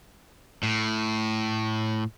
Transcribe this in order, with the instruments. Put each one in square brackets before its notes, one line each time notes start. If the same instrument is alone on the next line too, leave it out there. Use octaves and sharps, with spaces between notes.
[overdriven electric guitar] A2